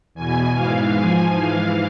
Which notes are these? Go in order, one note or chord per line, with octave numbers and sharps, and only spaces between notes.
E2 B2 G#5
G#2 E3 F5
G#2 F3 G#5
G#2 E3 F5